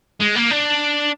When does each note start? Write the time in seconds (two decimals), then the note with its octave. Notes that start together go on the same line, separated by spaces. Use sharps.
0.20 G#3
0.35 A#3
0.50 D4